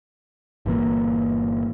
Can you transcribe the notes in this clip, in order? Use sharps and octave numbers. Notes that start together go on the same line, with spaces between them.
G1 A#2 E3 A#3